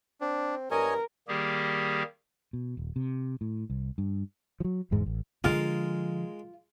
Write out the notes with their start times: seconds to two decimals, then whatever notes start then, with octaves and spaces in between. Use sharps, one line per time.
0.21 C4 D4
0.71 G2 A#4 C#5 D#5 G#5
1.28 D#3 G3 A#3 G4 G#4
2.53 B2
2.77 D#1
2.96 C3
3.41 A2
3.70 C2
3.98 G2
4.60 F3 F#3
4.91 G1 E2 G#2 G#3
5.06 A1
5.44 D3 F3 G#3 F4 A#4